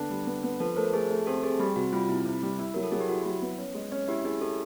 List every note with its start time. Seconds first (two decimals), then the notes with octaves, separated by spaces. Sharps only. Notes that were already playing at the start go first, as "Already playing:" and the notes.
Already playing: D3 B3 D4
0.10 G3
0.27 B3
0.43 B3
0.60 F3 A4 B4
0.76 A3 A#4 C5
0.93 A3 G#4
1.11 A3
1.27 C4 G4 A4
1.43 C4 G#4
1.59 G3 G4
1.76 C3 F#4
1.93 G3 F4
2.09 C3 E4
2.25 C3
2.43 G3
2.59 E4
2.74 F#3 A#4
2.83 A4
2.91 F#3 G#4
3.01 G4
3.09 E4 F#4
3.26 F#3
3.42 B3
3.58 C#4
3.75 G#3
3.92 C#4
4.08 E4 G4
4.25 E4 G#4
4.41 E4 G4 A4